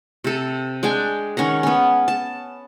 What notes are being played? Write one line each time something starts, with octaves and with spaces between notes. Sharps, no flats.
C3 A4
G#3 D4 G5 G#5
D#3 C#4 F#5 A#5
B3 C#4
A5